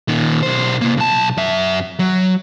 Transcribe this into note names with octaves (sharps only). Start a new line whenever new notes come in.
A#2 D#3
B1 C5
C3 A#3
B1 A5
F#2 E5
F#3